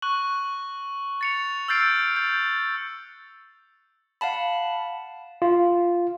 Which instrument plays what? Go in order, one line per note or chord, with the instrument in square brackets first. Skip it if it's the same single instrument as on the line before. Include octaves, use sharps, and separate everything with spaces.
[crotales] C#6 F#6 F#7
A6 C#7 F7
E6 F6 G6 A6 C7 D7
G6
[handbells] F5 F#5 A5 B5
[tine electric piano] F4